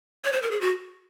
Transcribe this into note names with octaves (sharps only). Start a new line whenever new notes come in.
C#5
C5
A#4
G#4
F#4